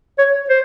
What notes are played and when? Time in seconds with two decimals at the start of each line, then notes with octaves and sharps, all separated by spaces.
0.19 C#5
0.50 C5